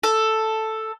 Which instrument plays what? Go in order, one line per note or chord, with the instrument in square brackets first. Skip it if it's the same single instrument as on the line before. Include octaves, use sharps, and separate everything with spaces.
[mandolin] A4